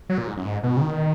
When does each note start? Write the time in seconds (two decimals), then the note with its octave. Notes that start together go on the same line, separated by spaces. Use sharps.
0.09 F#3
0.18 A#2
0.27 G#2
0.37 F#2
0.45 G#2
0.63 B2
0.77 C#3
0.81 D#3